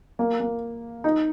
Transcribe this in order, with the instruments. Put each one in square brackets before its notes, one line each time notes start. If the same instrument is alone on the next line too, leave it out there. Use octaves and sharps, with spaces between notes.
[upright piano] A#3
A#3
D#4